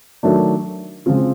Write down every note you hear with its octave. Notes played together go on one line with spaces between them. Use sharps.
D#3 F#3 A3 D4
C#3 F3 G#3 C4 F4